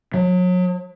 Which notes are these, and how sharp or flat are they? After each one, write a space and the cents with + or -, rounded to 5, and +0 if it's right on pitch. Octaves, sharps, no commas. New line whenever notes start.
F#3 -35